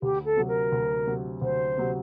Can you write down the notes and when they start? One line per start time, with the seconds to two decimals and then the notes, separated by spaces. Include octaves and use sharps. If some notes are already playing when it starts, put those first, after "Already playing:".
0.02 D2 G4
0.25 A4
0.36 C3 F#3
0.48 A#4
0.72 D2
1.07 C3 F#3
1.42 D2 C5
1.77 C3 F#3